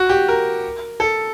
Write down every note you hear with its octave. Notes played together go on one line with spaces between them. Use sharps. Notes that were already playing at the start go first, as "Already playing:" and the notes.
Already playing: F#4
G4
A#4
A4